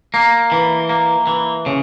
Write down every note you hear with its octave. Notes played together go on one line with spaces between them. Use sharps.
A#3
E3
A#3
E3
C#3